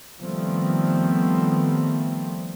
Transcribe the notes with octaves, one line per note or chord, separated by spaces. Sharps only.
D#3 F3 G3 A3 B3 C4